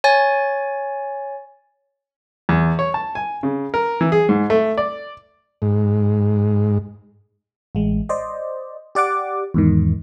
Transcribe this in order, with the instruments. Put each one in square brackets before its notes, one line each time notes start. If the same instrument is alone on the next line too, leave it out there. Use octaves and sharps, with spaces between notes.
[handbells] C#5 G#5 A6
[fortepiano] E2
C#5
A5
G#5
C#3
A#4
E3
G#4
G#2
A3
D5
[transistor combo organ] G#2
[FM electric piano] A1 G#3
C5 D5 D#5
G4 D5 F#5 D6
E2 G#2 D#3